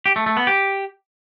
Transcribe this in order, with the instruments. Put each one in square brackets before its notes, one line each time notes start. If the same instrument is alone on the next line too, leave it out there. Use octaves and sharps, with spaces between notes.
[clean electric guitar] G4
A3
A3
B3
G4